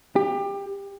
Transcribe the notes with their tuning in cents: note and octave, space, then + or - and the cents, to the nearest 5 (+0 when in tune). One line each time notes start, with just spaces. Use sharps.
G4 +25